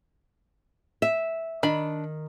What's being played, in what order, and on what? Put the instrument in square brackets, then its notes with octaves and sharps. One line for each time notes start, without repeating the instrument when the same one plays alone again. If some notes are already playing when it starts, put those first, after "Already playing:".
[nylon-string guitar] E5
[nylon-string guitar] D#3 [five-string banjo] D4 B5